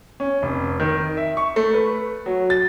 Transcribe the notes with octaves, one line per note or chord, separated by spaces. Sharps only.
C#4
F1
D#3
E5
C#6
A3
B4
F#3
A6